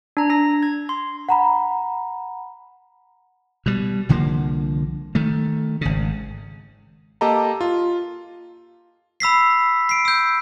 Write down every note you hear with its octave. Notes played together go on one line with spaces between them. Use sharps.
D4 A#5
D4 A#6
G#6
C6
F#5 A#5 B5
B2 G3
C2 D3 F3 A#3
D#3 A3
G#1 C#3
A#3 G4 A4 D#5 A5 A#5
F4
B5 E6 B6 C7
C7 D7
E6 G6